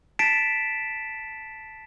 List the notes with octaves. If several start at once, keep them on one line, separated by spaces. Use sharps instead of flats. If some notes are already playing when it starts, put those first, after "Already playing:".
A5 A6 B6 C7 D7 E7